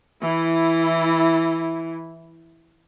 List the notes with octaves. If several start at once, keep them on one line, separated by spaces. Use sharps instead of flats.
E3 E4